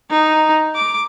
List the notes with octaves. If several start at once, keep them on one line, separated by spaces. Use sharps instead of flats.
D#4
D6